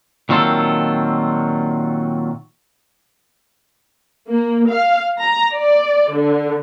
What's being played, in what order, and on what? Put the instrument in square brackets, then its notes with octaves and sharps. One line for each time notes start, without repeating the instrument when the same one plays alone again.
[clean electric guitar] A#2 D#3 F#3 C4 F4 A4
[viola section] A#3
F5
A#5
D5
D3